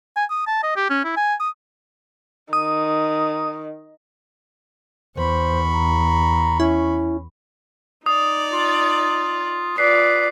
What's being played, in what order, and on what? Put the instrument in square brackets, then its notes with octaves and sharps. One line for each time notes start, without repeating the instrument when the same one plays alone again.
[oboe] G#5
D#6
A5
D#5
G4
C#4
E4
G#5
D#6
[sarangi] D#3 [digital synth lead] D#6
[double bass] E2 [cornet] C5 [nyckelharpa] B5 C#6
[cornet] A#5
[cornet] C#4 [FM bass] E4
[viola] D#4 D5 [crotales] D#6
[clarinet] F4
[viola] F4 [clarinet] B4 [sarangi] D5 [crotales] C7